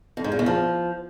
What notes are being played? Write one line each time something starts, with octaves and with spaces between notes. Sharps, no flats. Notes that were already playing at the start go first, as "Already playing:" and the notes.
F2
G#2
A#2
E2
F3